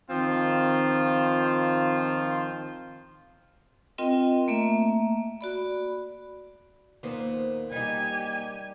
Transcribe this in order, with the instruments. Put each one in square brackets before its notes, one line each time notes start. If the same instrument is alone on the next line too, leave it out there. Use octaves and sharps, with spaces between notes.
[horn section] D#3 F3 C4 F4
[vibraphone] C4 F4 A#4 D#5 G5
A3 A#3 E5
F#4 D5 B5
[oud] D#2 B3 C5 [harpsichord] A#2
[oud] G3 D#4 [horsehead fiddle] G4 G#5